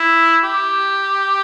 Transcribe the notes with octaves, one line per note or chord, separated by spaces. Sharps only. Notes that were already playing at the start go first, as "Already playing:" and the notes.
Already playing: E4
G4